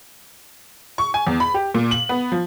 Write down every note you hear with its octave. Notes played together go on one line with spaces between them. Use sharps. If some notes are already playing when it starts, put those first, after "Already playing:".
C#6
G#5
E2
B5
G4
A#2
F#7
B3
F3